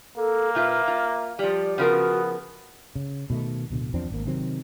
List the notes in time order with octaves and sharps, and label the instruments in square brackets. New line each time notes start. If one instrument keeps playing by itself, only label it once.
[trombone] A#3 [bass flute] A4
[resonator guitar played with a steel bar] A#2 F4 B4 [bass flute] E5
[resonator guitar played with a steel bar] F4
[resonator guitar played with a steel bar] F3 G3 [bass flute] D5
[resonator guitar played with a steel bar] C#3 F3 A#4 [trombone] B3 [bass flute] F#4
[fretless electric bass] C#3
B2 D#3 A3
D1 B2 D3
E2 F3 C4 D4
G#1 A#3
C3 D#3 F#3 C4